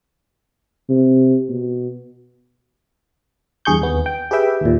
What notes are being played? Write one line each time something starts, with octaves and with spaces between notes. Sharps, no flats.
C3
B2
E2 G2 G#4 C#6 G6
D#2 B3
G5
G4 G#4 B4 E5 G5
D#2 A#2